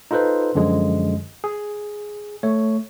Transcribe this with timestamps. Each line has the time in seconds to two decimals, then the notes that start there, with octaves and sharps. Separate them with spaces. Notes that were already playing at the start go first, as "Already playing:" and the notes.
0.11 D#4 F4 A4 B4 C5
0.55 F#2 D3 F3 G#3
1.44 G#4
2.43 A3 C#5